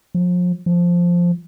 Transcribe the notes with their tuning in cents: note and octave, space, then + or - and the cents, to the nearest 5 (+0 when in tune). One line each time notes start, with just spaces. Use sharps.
F3 +35
F3 +0